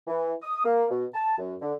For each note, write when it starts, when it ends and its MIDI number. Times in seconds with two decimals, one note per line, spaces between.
0.08 0.32 52
0.42 0.61 87
0.65 0.85 58
0.90 1.04 47
1.14 1.34 81
1.38 1.54 42
1.61 1.73 50